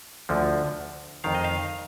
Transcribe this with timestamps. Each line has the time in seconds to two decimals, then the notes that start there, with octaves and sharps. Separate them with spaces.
0.29 D2 D3 F3
1.24 F2 D#3 F5
1.35 D#5
1.44 F5